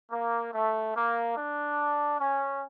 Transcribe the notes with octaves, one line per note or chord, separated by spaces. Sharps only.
A#3
A3
A#3
D4
C#4